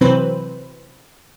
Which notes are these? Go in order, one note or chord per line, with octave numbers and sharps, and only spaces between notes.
C3 E3 F#3 C4 B4 C5